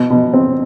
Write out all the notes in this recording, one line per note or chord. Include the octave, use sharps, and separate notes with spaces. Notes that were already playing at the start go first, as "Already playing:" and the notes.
Already playing: B2
B2
C4